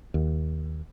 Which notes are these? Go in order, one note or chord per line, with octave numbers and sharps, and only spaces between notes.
D#2